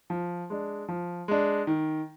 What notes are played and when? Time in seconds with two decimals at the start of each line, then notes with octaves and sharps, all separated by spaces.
0.10 F3
0.50 G#3 D4
0.88 F3
1.28 G#3 D4
1.67 D#3